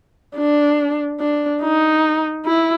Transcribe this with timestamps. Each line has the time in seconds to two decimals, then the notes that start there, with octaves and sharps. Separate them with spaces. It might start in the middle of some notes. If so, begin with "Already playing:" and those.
0.36 D4
1.20 D4
1.62 D#4
2.46 E4